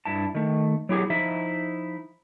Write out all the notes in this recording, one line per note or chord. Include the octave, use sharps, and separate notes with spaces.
G2 E4 A5
D#3 A3
F#3 E4 G4 G#4
F3 D#4 E4 E5